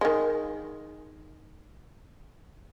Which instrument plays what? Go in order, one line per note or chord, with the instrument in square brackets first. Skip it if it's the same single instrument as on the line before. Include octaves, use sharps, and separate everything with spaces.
[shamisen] D#3 G#3